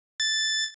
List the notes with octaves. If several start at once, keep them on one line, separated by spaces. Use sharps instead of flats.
A6